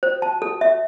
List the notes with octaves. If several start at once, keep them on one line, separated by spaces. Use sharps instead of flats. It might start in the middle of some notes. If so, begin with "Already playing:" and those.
C5
A5
A4
E5